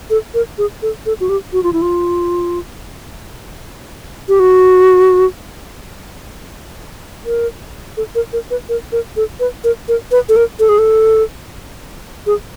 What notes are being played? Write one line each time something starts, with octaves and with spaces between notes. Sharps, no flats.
A4
A#4
G#4
A4
A4
F#4
G4
F#4
F4
E4
F4
G4
F#4
A#4
A4
A#4
A#4
B4
A#4
A#4
A4
B4
A#4
A#4
B4
A4
A#4
A4
G#4
A4
G#4